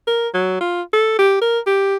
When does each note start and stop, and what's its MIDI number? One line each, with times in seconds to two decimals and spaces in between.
0.07 0.28 70
0.34 0.56 54
0.61 0.82 65
0.93 1.17 69
1.19 1.41 67
1.41 1.59 70
1.66 1.96 67